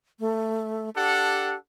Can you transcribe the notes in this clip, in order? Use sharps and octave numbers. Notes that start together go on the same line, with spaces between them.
A3
D4 G4 A4 F#5